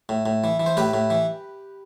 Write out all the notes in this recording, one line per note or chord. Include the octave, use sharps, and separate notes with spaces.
A2
A2
E3
E3
C5
A2 G4 B4
A2
E3